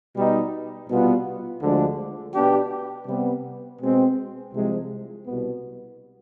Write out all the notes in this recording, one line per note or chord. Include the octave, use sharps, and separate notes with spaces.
B2 G3 B3 D#4
C2 B2 G3 B3 F4
D2 D3 F3 G#3 D4
B2 B3 D4 G4
C3 G3 B3
B2 G#3 C4
C2 C3 F3 G#3
C2 B2 B3